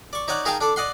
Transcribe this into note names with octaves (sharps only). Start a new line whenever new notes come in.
D5 C#6
D#4 C#5 D5 F#5
D#4 G#4 A#4 F5 G5 A5
D4 A4 D5
D5 D#5 F#5 C6